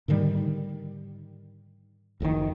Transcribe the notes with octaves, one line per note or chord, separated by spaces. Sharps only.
G#2 D3 D#3 G3
F#1 F2 C3 D#3